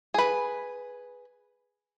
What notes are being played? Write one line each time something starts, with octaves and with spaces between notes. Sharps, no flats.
G#4 B4